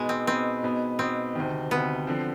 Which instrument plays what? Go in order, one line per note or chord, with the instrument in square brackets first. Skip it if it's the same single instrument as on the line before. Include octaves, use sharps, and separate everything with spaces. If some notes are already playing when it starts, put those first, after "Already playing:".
Already playing: [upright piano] B2 B3 D#4 [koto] G#3
[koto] C4
[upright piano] B2 B3 D#4 [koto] C4
[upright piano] B2 B3 D#4
[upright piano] B2 B3 D#4 [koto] C4
[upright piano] D2 C3 D#3
[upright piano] D2 C3 D#3 [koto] B3
[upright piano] D3 F3 C4